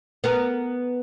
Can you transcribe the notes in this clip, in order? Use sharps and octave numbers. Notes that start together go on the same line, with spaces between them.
B3 A#4